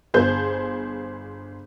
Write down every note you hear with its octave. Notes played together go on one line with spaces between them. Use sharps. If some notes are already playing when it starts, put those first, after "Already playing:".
G1 G#4 C5 G6